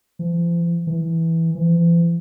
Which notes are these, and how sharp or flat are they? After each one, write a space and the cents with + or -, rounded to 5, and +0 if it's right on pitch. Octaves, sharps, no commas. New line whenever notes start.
F3 -40
E3 -5
E3 +45